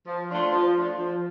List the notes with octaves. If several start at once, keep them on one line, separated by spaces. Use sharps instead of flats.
F3
A3 D4 F4
F3
A3 D4 F4
F3